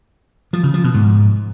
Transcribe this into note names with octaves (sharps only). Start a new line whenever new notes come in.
F3
C#3
F3
B2
G#2